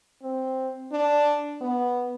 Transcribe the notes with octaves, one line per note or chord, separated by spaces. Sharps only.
C4
D4
B3